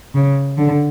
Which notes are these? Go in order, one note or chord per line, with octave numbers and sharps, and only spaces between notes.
C#3
D3